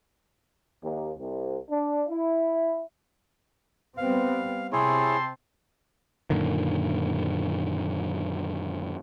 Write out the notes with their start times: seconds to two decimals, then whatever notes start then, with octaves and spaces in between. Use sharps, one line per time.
0.83 D#2
1.18 C2
1.69 D4
2.08 E4
3.97 G3 B3 C4 F5
4.72 C3 C4 E4 G#4 C#5 A5 C6
6.30 F#2 A#2 D3 D#3